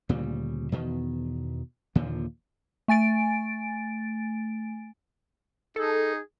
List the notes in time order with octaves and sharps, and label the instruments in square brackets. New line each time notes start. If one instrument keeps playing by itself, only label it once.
[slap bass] D2 A#2 C#3 G3
E2 B2 D#3
D#2 A#2 D3 F3
[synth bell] A3 G#5 A6 D7
[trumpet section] D#4 G#4 [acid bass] A4